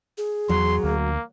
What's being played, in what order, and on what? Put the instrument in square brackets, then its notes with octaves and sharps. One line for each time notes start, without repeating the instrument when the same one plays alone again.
[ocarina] G#4
[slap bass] E2 [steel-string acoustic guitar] F#3 [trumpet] C6
[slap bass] D2 [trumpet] A#3